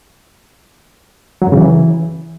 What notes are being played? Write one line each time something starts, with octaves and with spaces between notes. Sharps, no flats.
F#3
F#2
C#3
E3